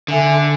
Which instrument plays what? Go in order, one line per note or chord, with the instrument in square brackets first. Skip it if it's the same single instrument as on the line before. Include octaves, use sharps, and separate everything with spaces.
[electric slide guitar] D3 [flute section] A4 E5 G#5